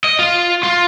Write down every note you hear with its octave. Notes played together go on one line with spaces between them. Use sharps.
D#5
F4
F4